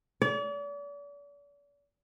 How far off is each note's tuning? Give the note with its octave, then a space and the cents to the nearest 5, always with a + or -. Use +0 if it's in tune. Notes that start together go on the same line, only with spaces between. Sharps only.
D5 -40